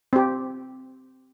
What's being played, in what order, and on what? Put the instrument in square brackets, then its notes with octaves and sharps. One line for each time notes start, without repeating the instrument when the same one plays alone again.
[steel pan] C4 G4